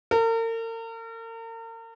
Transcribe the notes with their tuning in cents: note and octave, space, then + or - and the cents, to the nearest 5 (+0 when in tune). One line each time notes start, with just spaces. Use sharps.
A#4 -40